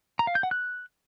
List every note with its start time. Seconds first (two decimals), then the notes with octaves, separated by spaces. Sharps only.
0.19 A#5
0.27 F5
0.35 G6
0.43 F#5
0.51 F#6